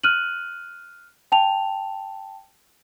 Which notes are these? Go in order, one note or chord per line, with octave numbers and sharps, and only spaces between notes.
F6 F#6 D#7 F#7
G5 A5 F7